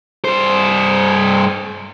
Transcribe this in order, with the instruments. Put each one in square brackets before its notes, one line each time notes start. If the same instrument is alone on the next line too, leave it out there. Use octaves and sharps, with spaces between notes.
[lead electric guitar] G2 C5